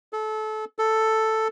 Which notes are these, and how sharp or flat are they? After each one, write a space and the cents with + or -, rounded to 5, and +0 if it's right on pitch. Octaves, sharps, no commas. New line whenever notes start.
A4 -25
A4 +5